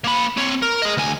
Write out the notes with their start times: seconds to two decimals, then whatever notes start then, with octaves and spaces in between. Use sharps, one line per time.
0.04 A#3 B5
0.37 C4 C#5
0.63 A#4
0.82 G#4 D#5
0.97 D2 G#5